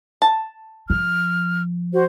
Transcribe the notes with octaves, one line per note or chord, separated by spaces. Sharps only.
A5
F3 F6
F#4 C5